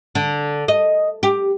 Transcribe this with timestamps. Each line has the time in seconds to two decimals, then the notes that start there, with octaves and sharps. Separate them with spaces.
0.15 D3
0.68 D#5
1.23 G4